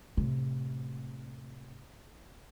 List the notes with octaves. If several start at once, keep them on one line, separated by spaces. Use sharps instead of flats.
A2 C3